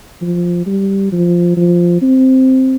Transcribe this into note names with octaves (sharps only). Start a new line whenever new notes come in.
F3
G3
F3
F3
C4